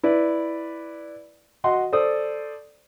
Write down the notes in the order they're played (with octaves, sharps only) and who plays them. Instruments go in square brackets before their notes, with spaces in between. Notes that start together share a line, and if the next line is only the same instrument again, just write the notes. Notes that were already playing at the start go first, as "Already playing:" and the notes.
[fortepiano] E4 B4 D5
F#4 D#5 F#5 C6
A4 C5 D5 D#6